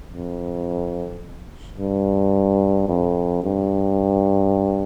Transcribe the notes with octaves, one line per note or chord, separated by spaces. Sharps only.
F2
G2
F2
G2